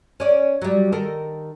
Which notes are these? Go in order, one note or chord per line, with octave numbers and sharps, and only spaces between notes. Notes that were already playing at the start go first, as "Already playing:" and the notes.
C#4 D5
F#3 G3
D#3 A4 A#4